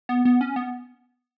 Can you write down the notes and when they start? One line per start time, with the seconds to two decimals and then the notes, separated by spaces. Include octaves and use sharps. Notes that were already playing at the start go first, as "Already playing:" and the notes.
0.09 B3
0.25 B3
0.41 C#4
0.56 B3